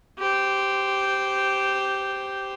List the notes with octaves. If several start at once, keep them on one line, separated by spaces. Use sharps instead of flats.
G4 C5